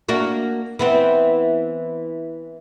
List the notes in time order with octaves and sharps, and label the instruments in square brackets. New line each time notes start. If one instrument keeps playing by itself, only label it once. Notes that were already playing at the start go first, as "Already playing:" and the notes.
[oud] A#3 D4 F#4
E3 B3 C4